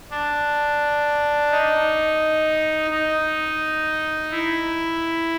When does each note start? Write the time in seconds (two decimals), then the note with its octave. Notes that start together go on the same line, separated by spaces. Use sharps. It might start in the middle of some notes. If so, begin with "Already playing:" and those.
0.11 D4
1.51 D#4
2.91 D#4
4.31 E4